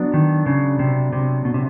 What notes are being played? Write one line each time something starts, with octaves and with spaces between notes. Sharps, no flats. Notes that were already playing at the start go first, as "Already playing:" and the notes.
Already playing: F#3 B3 D4
D#3
C#3
C3
C3
B2
C3